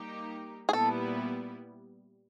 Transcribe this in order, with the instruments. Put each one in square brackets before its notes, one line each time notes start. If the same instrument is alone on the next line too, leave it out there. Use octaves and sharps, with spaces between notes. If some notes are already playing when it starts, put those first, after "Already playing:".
Already playing: [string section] G3 A#3 D#4 G4
[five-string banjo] G#4
[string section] A#2 G3 B3 E4 [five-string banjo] A4